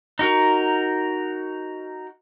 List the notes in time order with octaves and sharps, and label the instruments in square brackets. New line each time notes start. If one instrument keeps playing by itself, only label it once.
[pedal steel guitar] D#4 F#4 A#4